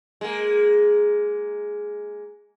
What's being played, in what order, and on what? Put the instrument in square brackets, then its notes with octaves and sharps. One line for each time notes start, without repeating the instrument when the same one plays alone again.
[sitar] G#3 A#3